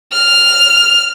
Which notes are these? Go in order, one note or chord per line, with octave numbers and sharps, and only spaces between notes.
F6